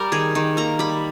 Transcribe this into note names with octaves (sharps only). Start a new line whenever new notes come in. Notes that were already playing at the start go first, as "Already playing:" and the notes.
Already playing: G3 A#4
D#3 G#4
D#3
A#3 A#5
G3 B5